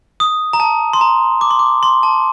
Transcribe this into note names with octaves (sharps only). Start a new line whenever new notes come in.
D#6
A#5
A5
C6
A#5
D6
C6
D6
C6
A5